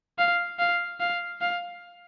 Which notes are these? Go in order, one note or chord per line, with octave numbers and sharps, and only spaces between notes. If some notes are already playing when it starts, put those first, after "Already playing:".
F5
F5
F5
F5